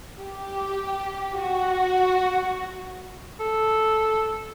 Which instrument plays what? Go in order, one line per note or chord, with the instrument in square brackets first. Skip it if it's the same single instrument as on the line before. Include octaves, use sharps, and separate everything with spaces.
[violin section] G4
F#4
[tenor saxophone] A4